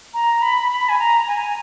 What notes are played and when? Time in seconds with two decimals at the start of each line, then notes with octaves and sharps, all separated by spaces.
0.14 A#5
0.42 B5
0.70 B5
0.89 G#5
0.99 A#5
1.28 G#5